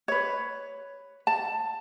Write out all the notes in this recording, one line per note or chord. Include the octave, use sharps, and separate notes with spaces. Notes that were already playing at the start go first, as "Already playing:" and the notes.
B4 C#5
A5